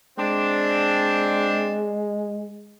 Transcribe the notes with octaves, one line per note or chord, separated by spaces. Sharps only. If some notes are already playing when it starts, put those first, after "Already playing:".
G#3 C4 D4